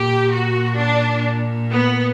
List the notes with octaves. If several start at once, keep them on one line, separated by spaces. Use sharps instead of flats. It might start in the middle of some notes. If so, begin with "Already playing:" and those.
Already playing: A#2 G4
F#4
D4
B3